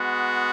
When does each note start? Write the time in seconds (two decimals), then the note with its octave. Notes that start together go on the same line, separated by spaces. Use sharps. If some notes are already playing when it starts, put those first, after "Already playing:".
Already playing: G#3 B3 F#4